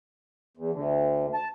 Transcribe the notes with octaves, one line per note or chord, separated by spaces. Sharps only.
E2
D2
A5